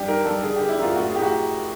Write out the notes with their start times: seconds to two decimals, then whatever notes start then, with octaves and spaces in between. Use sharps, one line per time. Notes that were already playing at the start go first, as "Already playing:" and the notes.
Already playing: G2 G4
0.08 D#3 A#4
0.25 G2 A4
0.43 D3 G#4
0.56 G4
0.61 D3
0.69 E4
0.78 F#2 F4
0.96 A2 F#4
1.09 G#4
1.14 A2 G4
1.22 F#4